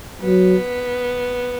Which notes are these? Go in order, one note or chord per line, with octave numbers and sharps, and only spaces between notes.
F#3 B3